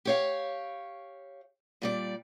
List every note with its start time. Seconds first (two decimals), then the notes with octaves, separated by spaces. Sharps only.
0.05 G4 C#5 F5
1.82 A#2 G3 D5